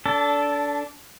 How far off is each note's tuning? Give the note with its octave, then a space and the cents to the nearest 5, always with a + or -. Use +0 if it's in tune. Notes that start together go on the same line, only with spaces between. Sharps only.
D4 -25 A4 +0